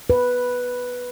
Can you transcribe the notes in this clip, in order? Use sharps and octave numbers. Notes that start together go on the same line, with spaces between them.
B4